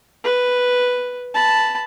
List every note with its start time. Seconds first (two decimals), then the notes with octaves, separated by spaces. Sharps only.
0.24 B4
1.35 A5 B5